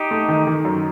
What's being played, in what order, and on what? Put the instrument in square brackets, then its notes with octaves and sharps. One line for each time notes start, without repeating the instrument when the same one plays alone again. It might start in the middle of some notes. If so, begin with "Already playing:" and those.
Already playing: [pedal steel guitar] D#4 G4
[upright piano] A3
D#3
D#3
F#2